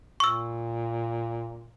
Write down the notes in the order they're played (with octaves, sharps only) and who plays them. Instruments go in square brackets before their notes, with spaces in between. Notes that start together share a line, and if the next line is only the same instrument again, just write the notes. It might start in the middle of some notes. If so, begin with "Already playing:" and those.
[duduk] A#2 [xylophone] C#6 E6